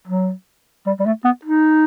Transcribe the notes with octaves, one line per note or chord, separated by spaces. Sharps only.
F#3
G3
G3
A3
B3
D#4